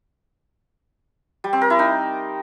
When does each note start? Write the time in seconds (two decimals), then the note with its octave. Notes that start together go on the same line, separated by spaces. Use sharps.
1.44 G3
1.53 C4
1.61 A#4
1.70 E4
1.79 D#4